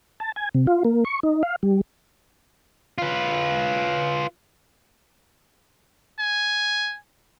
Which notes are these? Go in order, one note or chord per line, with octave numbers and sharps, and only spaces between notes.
A5
G#5
C3
F4
A#3
C#6
D#4
F5
G3
F4 B4
G#5